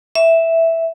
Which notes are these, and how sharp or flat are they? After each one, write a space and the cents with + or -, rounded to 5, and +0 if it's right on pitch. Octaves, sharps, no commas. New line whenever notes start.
E5 +0